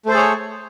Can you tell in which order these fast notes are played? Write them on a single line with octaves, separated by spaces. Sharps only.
A3 C5 A4 G#4 C#5